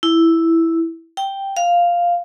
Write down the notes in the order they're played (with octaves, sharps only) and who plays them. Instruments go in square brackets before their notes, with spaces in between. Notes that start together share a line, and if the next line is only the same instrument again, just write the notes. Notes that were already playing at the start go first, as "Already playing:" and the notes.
[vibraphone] E4
G5
F5